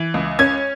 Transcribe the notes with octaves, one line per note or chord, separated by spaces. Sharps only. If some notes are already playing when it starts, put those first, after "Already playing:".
Already playing: E3
C#2
C#4 G#6